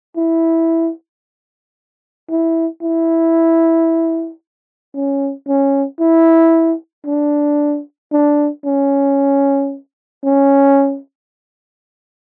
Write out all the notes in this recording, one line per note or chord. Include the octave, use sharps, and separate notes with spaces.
E4
E4
E4
C#4
C#4
E4
D4
D4
C#4
C#4